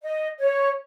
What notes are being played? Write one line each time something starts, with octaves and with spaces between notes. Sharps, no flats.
D#5
C#5